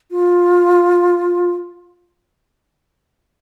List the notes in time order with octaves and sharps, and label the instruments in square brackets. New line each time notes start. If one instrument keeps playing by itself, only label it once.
[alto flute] F4